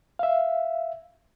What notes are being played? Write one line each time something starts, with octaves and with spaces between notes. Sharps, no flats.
E5 F5